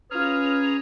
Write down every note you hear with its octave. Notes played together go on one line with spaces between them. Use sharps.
C#4 F4 G#4 B4 C#5 A#5 F6